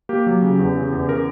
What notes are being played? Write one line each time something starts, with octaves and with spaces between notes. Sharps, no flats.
A#3 G4
F#3
C#3
E2
C#3
E2
C#3 A#4